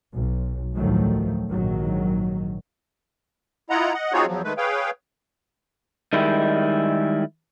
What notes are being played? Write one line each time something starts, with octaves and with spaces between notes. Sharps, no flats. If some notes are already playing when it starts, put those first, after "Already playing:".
B1
D2 A2 D#3 F3 F#3 A3
A#1 G#2 D#3 F#3
E4 F4 D#5 F#5 A#5
D#5 F#5
C4 D#4 F4 F#4 G#4 C#5
E2 F3 F#3
D#3 G#3 A3 B4
G#4 B4 C#5 F5 G5
D#3 G3 G#3 E4